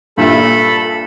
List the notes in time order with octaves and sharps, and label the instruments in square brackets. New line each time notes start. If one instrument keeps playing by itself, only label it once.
[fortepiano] G2 A#2 E5 [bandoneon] A4 B5